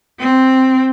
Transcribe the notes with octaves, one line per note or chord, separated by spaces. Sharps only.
C4